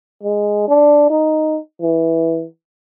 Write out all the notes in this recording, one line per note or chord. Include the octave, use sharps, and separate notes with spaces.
G#3
D4
D#4
E3